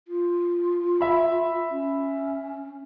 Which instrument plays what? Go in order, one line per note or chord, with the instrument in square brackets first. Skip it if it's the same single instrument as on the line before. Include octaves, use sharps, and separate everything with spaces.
[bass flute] F4
[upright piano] E5 B5
[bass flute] C#4